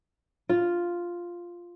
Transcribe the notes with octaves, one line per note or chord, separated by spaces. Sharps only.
F4